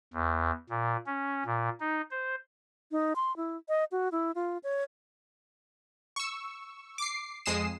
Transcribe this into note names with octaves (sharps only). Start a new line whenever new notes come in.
E2
A#2
C#4
A#2
D#4
C5
D#4
C6
E4
D#5
F#4
E4
F4
C#5
C#6 E6
D6 C7
F2 G#3 D#6 C7 E7